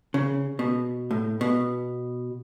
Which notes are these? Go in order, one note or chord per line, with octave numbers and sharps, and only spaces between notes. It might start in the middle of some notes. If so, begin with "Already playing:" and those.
C#3
B2
A2
B2